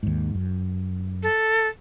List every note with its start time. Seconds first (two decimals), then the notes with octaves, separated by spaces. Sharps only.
0.03 D#2 G#2
0.35 F#2
1.23 A4